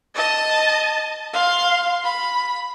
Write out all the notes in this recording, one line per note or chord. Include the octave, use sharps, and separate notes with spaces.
D#5 A5
F5 C6
B5